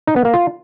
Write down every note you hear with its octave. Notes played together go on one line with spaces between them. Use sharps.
D#4
B3
A#3
F4